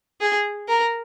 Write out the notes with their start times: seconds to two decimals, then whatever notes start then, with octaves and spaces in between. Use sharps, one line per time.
0.21 G#4
0.68 A#4